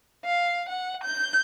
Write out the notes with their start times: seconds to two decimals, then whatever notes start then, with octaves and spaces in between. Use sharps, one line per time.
0.25 F5
0.69 F#5
1.04 G6